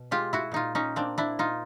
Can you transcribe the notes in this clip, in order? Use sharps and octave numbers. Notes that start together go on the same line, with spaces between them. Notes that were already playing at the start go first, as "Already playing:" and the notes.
Already playing: B2
G#3 F4 G4
E4 F#4
A#2 D#4 F4
C#4 D#4
A#3 C4 D4
D4 E4
A#2 D#4 F4